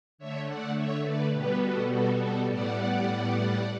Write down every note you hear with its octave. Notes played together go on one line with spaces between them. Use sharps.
D3 A3 C#5 E5
D5 F#5
C#5 E5
B4 D5
B2 G3 B3 G4 B4
F#4 A4
F#4 A4
F#4 A4
A2 G3 B3 D5 F#5